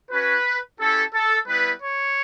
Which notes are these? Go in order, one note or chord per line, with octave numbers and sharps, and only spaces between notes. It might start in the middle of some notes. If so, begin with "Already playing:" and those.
C#4 F#4 B4
C#4 E4 G4 A4
A4
G3 B3 E4 B4
C#5